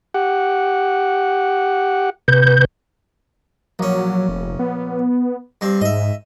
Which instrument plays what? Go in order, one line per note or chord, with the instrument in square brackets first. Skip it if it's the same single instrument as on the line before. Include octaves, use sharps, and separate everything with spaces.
[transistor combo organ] G4 F#5
[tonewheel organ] C3 B4 G6
[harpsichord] A#1 C#4 [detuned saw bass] F#3
[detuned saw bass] F1
B3
[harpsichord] G2 C4
[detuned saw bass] G#2 [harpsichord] D#5 E5